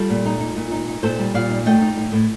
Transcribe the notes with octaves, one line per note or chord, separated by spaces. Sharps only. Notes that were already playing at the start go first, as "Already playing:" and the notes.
Already playing: G3 F4 A4
A#2
D#4
D#4
A#2
D#4
D#4
A#2 A4 C5
G3
A#2 D5 F5
D#4
A3 D#5 G5
D#4
A2
A2